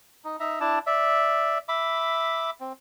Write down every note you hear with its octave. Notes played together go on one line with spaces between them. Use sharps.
D#4
D#4 E5 A#5
D4 E4 A5
D5 E5
E5 B5 D6
C4